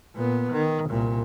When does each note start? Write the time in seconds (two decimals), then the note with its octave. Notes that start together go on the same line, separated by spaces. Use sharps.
0.15 A#2 B3
0.52 D#3
0.89 C2 A#2